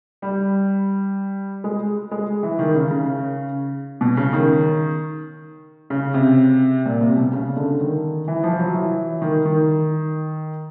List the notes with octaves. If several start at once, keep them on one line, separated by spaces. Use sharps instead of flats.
G3
G#3
G#3
E3
D#3
C#3
C#3
B2
C#3
D#3
C#3
C3
A#2
C3
B2
C#3
D3
D#3
E3
F3
F#3
E3
D#3
D#3